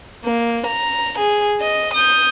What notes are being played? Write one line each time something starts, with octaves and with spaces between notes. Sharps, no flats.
A#3
A#5
G#4
D#5
D#6 G6